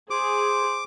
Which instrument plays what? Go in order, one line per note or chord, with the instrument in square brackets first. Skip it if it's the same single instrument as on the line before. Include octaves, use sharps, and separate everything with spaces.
[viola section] G#4 [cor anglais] C5 [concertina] D6